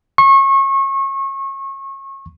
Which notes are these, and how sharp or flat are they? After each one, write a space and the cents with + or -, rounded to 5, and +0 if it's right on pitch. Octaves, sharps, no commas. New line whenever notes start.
C#6 -30